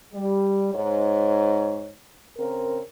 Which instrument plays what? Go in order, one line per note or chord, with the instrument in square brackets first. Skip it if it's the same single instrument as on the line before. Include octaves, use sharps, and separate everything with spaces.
[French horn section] G3
G#2 C#5
C#3 C4 A#4